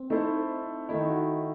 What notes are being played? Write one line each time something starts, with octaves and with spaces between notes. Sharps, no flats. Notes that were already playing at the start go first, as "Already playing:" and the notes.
Already playing: C4
A3 D#4 E4 A4 C5
D#3 A3 D#4 E4
F#4